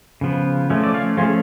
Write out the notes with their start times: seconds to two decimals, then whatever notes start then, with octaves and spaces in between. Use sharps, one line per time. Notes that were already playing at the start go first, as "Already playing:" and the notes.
0.21 C#3 F3 B3
0.70 F3 A3 C#4
0.84 D5
0.94 C#5 F5
1.17 F3 A3 C#4 F4 G#4